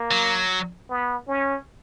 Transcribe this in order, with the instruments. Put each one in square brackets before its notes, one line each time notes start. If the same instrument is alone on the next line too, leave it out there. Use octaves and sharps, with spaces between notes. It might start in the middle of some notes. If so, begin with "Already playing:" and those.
Already playing: [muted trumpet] A#3
[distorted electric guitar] F#3
[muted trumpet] B3
C#4